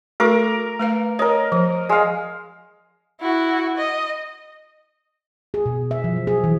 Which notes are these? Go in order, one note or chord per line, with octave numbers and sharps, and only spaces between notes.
A3 F#4 A4 A#4 D6
A3 B4 F5
A#4 C#5 D#5
F3
G#3 F5
E4 F#4
D#5
G#4
B2
E5
F3
F#3
G#4
E3